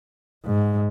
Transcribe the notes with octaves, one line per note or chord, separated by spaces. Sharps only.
G#2